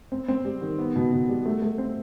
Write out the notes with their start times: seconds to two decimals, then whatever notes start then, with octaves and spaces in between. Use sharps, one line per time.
0.12 C4
0.28 C4
0.45 G3
0.61 D#3
0.79 B3
0.96 B2
1.12 B2
1.29 G3
1.45 A3
1.62 A3
1.78 C4